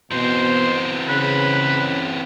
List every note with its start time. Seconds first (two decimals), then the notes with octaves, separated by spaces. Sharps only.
0.11 B2 E3 C4 C5
1.08 C#3 B4